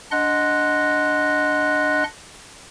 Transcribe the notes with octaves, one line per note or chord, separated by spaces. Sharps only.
D4 D#5 F#5 C6 F#6 A#6